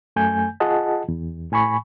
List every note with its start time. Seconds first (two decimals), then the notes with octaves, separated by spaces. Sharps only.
0.16 F#2 A3 G#5 G6
0.60 F4 G#4 D#5 F#5 A5
1.08 E2
1.52 A2 G#5 B5 C#6